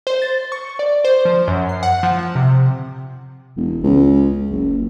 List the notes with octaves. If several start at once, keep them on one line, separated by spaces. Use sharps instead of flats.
C5
A6
C#6
D5
C5
F3
F#2
C7
F#5
F3
C3
E1
C#2
F#1